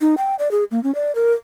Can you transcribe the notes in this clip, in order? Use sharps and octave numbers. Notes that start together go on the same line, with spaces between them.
D#4
G5
D5
G#4
A#3
C#4
D5
A#4